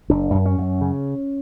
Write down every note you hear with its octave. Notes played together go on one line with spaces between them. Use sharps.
F#1 D4
F#2
C#4
F#2
C#3